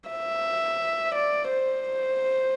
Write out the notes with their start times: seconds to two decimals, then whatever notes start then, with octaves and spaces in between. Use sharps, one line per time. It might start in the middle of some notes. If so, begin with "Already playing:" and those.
0.10 E5
1.15 D5
1.50 C5